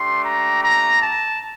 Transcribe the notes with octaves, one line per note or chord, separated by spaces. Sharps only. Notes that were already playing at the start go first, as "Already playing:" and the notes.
Already playing: A3 D4 G4 C6
A#5
A#5
A5